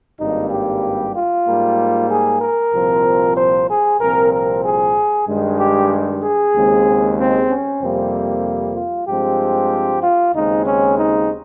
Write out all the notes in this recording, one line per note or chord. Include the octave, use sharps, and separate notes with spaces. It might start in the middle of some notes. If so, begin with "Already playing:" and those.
G#1 G2 G3 A#3 D#4
G4
F4
G#2 G3 A#3
G#4
A#4
C2 A#2 F3 C4
C5
G#4
C2 A#2 F3 C4 A#4
A#4
G#4
G2 D#3 G#3
G4
G#4
D#2 C#3 G#3 C4
C4
C#4
F2 C3 G3 A#3 C4
F4
G2 F3 G#3 C4 G4
F4
D#2 C#3 G#3 C4 D#4
C#4
D#4